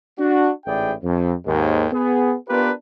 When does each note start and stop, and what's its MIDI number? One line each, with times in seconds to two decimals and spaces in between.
0.19 0.50 62
0.19 0.50 66
0.66 0.93 33
0.66 0.93 44
0.66 0.93 64
0.66 0.93 68
0.66 0.93 74
0.66 0.93 79
1.03 1.33 41
1.46 1.87 39
1.46 1.87 44
1.92 2.34 59
1.92 2.34 68
2.48 2.71 59
2.48 2.71 62
2.48 2.71 65
2.48 2.71 67
2.48 2.71 70
2.48 2.71 71